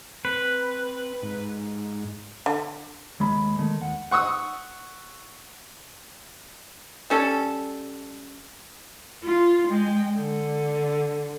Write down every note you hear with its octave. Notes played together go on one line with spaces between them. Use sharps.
C4 B4
G#2
D3
D#2 G#3 B5
D#3 G#3 A3
D#2 F#5
F#5 C#6 D#6 E6
G3 C#4 A4
F4
G#3 G5
D3